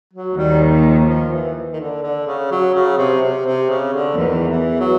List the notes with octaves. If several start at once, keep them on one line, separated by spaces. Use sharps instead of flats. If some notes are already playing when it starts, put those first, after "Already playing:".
F#3
D#2 D#3 G3
F3
F3
E3
D#3
D3
D3
C#3
F#3
C#3
C3
C3
C3
C#3
D3
E2 D#3 E3
E3
F#3